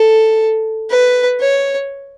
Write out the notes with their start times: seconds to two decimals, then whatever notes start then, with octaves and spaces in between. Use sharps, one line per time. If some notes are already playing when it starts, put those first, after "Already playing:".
Already playing: A4
0.90 B4
1.41 C#5